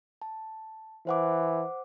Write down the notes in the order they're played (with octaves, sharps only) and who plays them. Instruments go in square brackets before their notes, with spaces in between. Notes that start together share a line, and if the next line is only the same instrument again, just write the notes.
[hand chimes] A5
[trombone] E3 [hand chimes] C5 F#5 D6